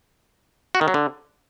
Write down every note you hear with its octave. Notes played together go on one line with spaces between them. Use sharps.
F#4
D#3
F#3
D3